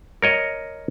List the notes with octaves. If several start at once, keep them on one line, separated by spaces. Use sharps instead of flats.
A#4 C#5 D#5